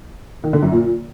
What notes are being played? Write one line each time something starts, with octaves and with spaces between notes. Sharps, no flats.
D#3
D3
F#2
A#2